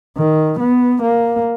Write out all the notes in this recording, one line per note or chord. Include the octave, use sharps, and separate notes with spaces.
D#3
B3
A#3